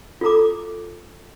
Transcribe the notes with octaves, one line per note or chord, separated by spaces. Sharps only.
F4 F#4 A4 A#5 D6